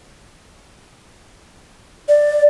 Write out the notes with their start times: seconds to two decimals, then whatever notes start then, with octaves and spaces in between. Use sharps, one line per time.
2.08 D5